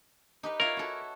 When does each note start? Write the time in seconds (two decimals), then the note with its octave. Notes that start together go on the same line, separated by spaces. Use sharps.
0.43 D#4 G4 B4
0.60 E4 F4 A#4 C#5
0.77 F#4 A4